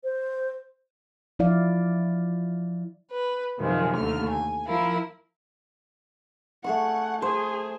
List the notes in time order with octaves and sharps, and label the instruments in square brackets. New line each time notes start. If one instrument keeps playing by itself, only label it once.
[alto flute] C5
[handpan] F3 E4 D5 F5
[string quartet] B4
F#2 C3 D#3 F3 G#3
D#2 D3 A3 F6
G#5
F3 E4 A#4 F5
[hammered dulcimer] A3 G#4 C#6 [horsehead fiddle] F#5
[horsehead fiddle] G#4 [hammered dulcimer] C5